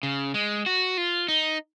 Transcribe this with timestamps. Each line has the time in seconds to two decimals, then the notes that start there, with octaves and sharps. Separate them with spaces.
0.03 C#3
0.34 G#3
0.66 F#4
0.97 F4
1.28 D#4